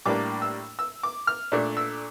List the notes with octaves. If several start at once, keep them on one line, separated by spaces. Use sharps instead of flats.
A2 G3 A#3 D4 D6
E6
E6
D6
F6
A#2 A3 D4
E6